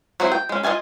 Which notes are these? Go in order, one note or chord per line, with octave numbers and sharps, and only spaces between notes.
F#3 C4 E4 F#4 G#4
G5
G#3 C#4
F4 D#5 E5 G#5 A5